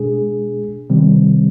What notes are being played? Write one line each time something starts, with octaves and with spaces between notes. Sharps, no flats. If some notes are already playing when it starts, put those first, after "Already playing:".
Already playing: B2 G#3 D4 G#4
C3 D#3 G3 C4